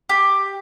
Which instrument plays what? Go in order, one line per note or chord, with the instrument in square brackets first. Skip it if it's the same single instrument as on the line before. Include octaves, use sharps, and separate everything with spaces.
[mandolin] G4